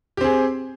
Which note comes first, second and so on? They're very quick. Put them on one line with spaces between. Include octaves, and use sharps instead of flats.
G4 C4 G#4